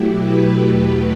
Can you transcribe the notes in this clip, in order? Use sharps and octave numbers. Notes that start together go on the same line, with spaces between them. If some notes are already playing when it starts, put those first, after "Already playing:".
Already playing: B2 F#3 A3 E4 G4
G4 B4
E2 B2 F#3 A3 G4 B4